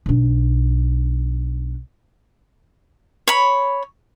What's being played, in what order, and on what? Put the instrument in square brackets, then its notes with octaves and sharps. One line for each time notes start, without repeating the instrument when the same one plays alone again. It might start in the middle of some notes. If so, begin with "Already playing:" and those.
[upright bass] B1 D4
[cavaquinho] C#5 B5